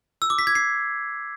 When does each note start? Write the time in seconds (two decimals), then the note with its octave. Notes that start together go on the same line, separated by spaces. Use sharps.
0.22 E6
0.30 D6
0.39 B6
0.47 G#6
0.55 C7